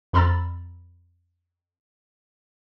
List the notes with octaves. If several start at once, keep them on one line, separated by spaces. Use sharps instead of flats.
F2 A#5 B5 E6 A6